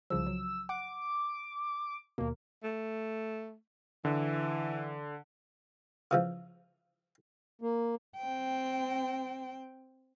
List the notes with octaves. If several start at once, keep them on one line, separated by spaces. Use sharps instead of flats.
C2 C#3 F3 E6
F#3
F#5 D6
D#2 B2 A#3
A3
D3 E3
C#3 E3 F3
A#3
C4 G5